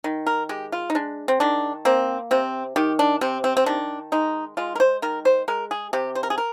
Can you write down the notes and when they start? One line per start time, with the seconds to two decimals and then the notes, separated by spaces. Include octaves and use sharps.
0.04 D#3
0.27 A#4
0.49 G#3 G4
0.72 F4
0.90 D#4
0.95 G#3 D4
1.28 C4
1.40 D#3 D4
1.85 A#3 C4
2.31 C3 C4
2.76 D#3 G4
2.99 D4
3.21 C3 C4
3.44 C4
3.57 C4
3.66 D#3 D4
4.12 G#3 D#4
4.57 G#3 F4
4.75 A#4
4.80 C5
5.02 D#3 A#4
5.25 C5
5.48 G#3 A#4
5.71 G#4
5.93 C3 G4
6.15 C5
6.23 A#4
6.30 G#4
6.38 A#4